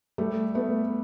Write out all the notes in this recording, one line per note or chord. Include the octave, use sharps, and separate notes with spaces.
G3 A3
A3 B3